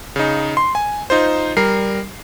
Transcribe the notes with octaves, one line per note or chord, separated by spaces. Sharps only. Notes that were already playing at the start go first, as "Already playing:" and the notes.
C#3 D#4
C6
G#5
D#4 F4 C5
G3 A#4 C7